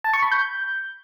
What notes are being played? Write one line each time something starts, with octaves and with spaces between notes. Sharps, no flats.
A5
C#6
B5
G6